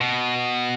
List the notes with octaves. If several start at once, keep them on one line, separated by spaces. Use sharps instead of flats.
B2